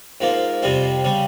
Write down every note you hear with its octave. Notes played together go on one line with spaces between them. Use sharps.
G#2 F3 A#3
F2 C3 G3 C4
C#3 G3